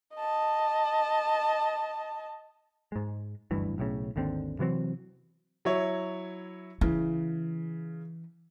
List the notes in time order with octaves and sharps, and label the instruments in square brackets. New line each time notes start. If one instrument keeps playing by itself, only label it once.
[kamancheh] D#5 A5
[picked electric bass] G#2 G#3
F#1 D2 G2 E3
B1 A2 C#3
G#1 D#2 D3 C4
C3 E3 F#3 C4
[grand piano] F#3 E4 C#5
[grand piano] C#3 [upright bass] E3